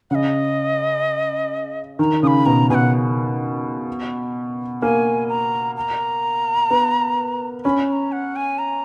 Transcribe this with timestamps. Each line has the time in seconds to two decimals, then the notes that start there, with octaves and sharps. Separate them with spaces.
0.11 C#3 D#5 F#5
1.99 D#3 A#5
2.23 C#3 D#6
2.27 B5
2.46 B2 A#5
2.70 B2 F#5 G#5
4.82 A#3 G#5
5.29 A#5
5.77 A#5
6.70 B3
7.65 C#4 B5
7.88 B5
7.93 A#5
8.12 F#5
8.36 G#5
8.59 A#5